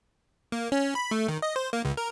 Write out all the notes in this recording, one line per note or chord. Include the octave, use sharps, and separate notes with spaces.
A#3
C#4
B5
A3
D#3
D#5
C5
A#3
C#2
A#4